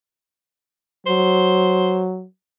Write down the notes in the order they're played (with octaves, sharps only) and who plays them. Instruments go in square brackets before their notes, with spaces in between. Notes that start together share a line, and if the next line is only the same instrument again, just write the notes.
[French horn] F#3 [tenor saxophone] C5